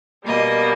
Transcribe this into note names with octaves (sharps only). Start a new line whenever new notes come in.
B2 G3 A#3 D#5